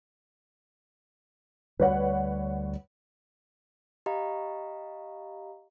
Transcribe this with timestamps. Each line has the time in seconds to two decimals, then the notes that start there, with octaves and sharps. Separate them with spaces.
1.80 D2 G3 B4 C#5 F#5
4.06 G4 D#5 F5 A#5 B5